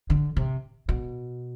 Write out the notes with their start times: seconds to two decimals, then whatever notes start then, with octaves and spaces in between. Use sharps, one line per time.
0.10 D3
0.37 C3
0.89 B2